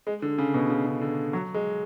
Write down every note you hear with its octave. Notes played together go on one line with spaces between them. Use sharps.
G#3
D3
C#3
B2
C#3
C#3
D3
F#3
G#3